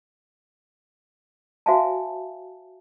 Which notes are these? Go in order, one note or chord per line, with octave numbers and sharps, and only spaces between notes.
F#4 C5 E5 F5 G#5 A5